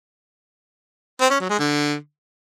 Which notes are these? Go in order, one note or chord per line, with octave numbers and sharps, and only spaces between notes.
C4
C#4
F#3
G#3
D3